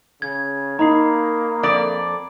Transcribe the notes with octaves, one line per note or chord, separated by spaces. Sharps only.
C#3 G#6
A#3 D#4 A#5 B5 C7
F2 D5